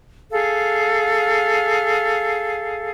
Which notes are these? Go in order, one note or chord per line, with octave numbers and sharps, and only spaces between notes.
G#4 A4 F5